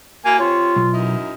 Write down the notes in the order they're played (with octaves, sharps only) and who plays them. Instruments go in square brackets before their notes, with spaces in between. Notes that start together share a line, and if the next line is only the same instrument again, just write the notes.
[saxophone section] A#3 E4 F#4 [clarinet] G#5
[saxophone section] C3 C#5 [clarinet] F4
[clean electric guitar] B1
[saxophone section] F#2 D#4 E4